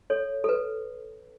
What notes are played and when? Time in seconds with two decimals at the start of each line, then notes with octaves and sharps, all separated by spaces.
0.10 A4 C#5
0.44 A4
0.49 B4